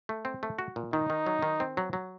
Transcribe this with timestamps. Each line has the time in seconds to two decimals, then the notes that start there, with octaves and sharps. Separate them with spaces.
0.09 A3
0.25 C4
0.43 A3
0.59 F#4
0.76 A#2
0.93 D#3 D#4
1.10 D#3
1.26 F#3
1.42 D#3
1.60 C4
1.77 F#3
1.93 F#3